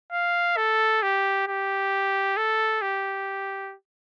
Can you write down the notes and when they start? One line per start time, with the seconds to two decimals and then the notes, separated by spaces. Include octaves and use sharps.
0.12 F5
0.57 A4
1.02 G4
1.48 G4
2.37 A4
2.82 G4